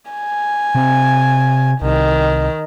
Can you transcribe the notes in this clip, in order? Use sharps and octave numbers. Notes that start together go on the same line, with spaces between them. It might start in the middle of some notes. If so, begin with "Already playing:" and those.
G#5
C3
C2 D#3